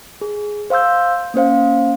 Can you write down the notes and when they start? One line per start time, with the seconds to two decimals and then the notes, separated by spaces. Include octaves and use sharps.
0.21 G#4
0.70 C5 F5 C6 E6 G6
1.34 A#3 C#4 C5 F5